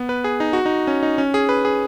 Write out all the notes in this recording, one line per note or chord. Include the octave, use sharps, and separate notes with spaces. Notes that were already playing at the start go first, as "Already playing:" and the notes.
Already playing: B3
B4
G#4
D#4
F#4
D#4
C#4
D#4
C#4
G#4
B4
G#4